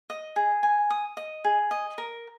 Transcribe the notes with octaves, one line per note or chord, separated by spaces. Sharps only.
D#5
G#4
G#5
D#6
D#5
G#4
D#5
A#4